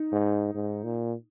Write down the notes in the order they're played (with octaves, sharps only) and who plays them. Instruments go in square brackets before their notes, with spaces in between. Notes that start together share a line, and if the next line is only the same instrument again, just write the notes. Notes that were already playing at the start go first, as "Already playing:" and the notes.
Already playing: [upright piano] D#4
[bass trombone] G#2
G#2
A#2